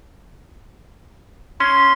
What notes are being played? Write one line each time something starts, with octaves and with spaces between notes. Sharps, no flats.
C#4 C6